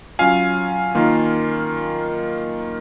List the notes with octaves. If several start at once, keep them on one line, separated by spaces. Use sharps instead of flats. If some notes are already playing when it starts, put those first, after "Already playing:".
F#3 C#4 F4 F5 G#5
D#3 A#3 F4